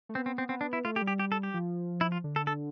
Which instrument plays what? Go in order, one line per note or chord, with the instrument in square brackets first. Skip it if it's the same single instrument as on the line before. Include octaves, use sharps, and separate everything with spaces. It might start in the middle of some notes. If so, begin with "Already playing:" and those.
[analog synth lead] A3
[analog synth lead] B3 [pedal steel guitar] C4
[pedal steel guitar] C4
C4
[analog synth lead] B3 [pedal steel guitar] C4
[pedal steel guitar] D4
E4
[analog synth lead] A3 [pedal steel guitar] F4
[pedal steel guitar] G4
[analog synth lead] G3
[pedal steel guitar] G4
G4
A4
G4
[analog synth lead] F3
[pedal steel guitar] E4
F4
[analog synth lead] D3
[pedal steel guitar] A4
A4